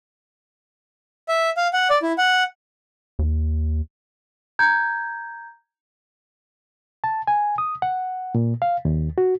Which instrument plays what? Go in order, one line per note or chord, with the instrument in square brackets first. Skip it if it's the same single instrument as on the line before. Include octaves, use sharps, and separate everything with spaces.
[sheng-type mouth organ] E5
F5
F#5
D5
E4
F#5
[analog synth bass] D#2
[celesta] A#5 G6 G#6
[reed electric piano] A5
G#5
D#6
F#5
A#2
F5
D#2
F#4